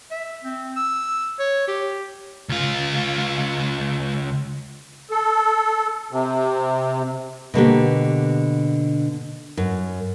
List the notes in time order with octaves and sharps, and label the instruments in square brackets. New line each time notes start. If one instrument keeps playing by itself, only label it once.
[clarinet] E5
C4
E6
C#5
G4
[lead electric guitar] C#2 F4
[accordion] A4
C3
[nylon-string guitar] B2 D3 A#3 G4
F#2